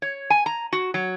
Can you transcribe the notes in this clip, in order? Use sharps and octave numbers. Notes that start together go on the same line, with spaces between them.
C#5
G#5
A#5
F#4
F#3